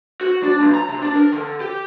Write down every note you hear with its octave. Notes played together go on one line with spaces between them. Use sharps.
F#4
D4
B1
A#5
C3
D4
A#4
D3
G4